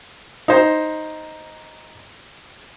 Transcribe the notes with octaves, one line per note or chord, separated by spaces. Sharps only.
D#4 C5